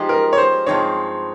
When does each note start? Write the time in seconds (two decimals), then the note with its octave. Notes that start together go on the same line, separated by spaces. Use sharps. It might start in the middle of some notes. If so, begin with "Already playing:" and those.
Already playing: F3 G#3 D#4 G4
0.09 A#4
0.33 C#5
0.38 C5
0.66 G2 F3 G#3 C4 D#4 C#5